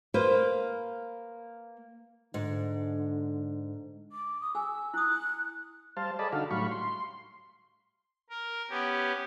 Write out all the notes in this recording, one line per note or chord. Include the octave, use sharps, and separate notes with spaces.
A#3 B4 C5
G#2 D3
D6
D#6
G#4 G#5 E6
E4 D#6 F#6
G3 C5 F5 A5
G#4 A4 D5 D#5 A5 B5
D3 D#4 F#4 A4 F5
A2 F#3 G3 F5 B5 C#6
C6
A#4
B3 C#4 G4